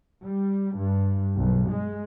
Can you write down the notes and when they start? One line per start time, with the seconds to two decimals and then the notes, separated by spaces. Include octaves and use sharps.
0.24 G3
0.78 G2
1.36 B1
1.71 G#3